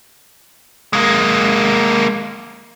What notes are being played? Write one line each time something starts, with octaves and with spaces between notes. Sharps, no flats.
G#3 A#3